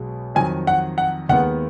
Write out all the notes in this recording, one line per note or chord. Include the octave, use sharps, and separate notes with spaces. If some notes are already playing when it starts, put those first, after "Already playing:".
Already playing: B1 B2 G#3 B3
F2 D#3 F#3 G#5
F#5
F#5
D#2 D#3 G#3 B3 F#5